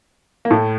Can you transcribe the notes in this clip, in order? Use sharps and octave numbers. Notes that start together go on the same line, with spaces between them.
A#3
A2 A3